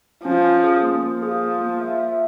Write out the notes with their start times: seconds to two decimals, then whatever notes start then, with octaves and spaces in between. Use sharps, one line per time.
0.24 F3 C#4
0.44 C#4
0.64 G#4
0.82 A#3
1.03 F3 A#3
1.23 G#4
1.42 A#3
1.61 A#3
1.81 E5
2.00 E5